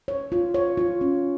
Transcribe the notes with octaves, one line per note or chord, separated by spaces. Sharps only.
C#5
F4
C#5
F4
C#4